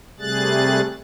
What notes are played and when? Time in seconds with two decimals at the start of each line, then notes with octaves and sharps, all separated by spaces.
0.20 C3 G3 A3 G#4 F#6 A6